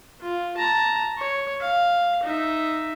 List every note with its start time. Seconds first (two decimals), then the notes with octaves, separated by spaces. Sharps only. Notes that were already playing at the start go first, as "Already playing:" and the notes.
0.21 F4
0.57 A5 A#5
1.18 C#5
1.61 F5
2.23 D#4 E5